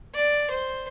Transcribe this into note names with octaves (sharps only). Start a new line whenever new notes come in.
D5
C5